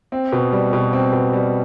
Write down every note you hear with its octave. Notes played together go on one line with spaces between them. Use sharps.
C4
B2
G3
B2
C4
B2
G3